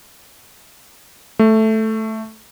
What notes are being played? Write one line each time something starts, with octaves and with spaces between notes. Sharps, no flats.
A3